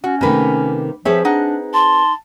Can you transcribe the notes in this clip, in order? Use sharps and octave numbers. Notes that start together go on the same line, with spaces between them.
C#4 F#4
C3 D#3 A3 A#3 B4
F3 C4 G4 G#4 B4 C#5 E5
D4 D#4 F#5
A5 C6